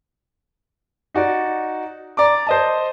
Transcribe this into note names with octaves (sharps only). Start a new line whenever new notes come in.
D#4 F#4 D5
D5 A#5 D6
C5 D#5 A5